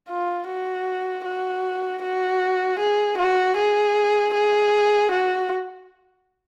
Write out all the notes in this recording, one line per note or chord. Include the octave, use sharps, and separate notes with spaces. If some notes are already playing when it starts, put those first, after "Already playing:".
F4
F#4
F#4
F#4
G#4
F#4
G#4
G#4
F#4